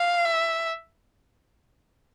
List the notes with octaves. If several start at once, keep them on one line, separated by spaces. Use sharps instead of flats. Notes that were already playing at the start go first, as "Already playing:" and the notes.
Already playing: F5
E5